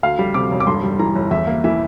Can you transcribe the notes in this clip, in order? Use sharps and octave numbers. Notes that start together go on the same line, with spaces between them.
D2 F5
G3
C3 D6
E1
D6
G2 C6
G3
E3 A#5
G1
E2 E5
A#3
E3 E5